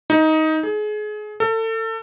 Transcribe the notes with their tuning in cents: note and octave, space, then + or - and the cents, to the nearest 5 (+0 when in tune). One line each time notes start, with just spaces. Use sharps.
D#4 +15
G#4 +30
A4 +30